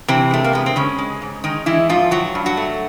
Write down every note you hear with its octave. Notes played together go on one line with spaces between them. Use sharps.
C3 E3 C4
G#3 A3
A#3
G#3 B3
C4
C#3 G#3 C#4
G#3
G#2
D#3 G#3 D#4
E3 G#3 E4
G#2 F3 F4
G2 F#3 F#4
G2
F#3 F#4
A3